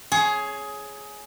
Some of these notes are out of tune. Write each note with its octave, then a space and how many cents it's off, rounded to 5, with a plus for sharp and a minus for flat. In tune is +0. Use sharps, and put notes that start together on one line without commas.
G#4 +15 C#5 +0